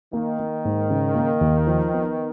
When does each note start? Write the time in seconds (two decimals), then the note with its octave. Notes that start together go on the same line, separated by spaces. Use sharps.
0.13 D#3 A#3
0.39 A#3
0.65 G#2
0.90 C#3
1.15 A#3
1.41 D#2
1.67 F3
1.93 B3